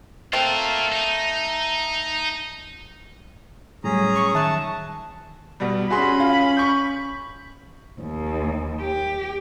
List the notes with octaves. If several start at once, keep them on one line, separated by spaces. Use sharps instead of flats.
A3 C4 F4 A#4
D#4
A2 F#3 G3 C#4 G#4 A#5
C#6
D#3 E5 A5 F#6
B2 G3
C#4 F#4 G#4 B5 C6
F4
C#6 G6
D#2
G4